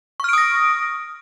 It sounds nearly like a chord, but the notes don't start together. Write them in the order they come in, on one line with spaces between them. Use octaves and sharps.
C#6 F6 D7 D#6 A#6